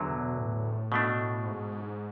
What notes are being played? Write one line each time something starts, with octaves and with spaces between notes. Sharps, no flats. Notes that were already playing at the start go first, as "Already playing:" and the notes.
Already playing: E2 D3 F#3
B2
A2
B2 A3 D4
G#2